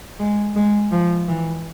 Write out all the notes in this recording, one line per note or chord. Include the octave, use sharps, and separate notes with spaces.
G#3
G#3
F3
E3